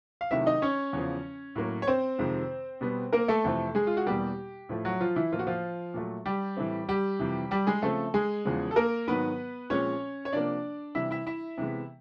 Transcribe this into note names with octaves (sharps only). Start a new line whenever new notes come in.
F5
C3 D#3 F#3 A3 C4 E4 E5
D#4 D#5
C#4 C#5
E2 C#3 F3
A2 F#3 A#3
C#5
C4 C5
F2 C3 D#3 G#3
B2 G3 B3
A#3 A#4
A3 A4
F2 C3 E3 A3 C4
G#3 G#4
F4
F#4
E2 B2 G3 A#3 G4
A2 F3 A3
F#3 F#4
F3 F4
E3 E4
A2 F3 A#3 F4
F#4
F3 F4
A#2 F#3 A3
G3 G4
A2 E3 A3 C4
G3 G4
F2 C3 E3
G3 G4
G#3 G#4
C#3 F3 A3 C4 A4
G#3 G#4
E2 C#3 F3 G#3
A4
A#3 A#4
G#2 D#3 F#3 B3 B4
A#2 F3 G#3 C4 C#4 C#5
C#5
C3 F3 A#3 D4 D5
C3 E3 G3 E4 E5
E4 E5
E4 E5
C3 E3 G#3 B3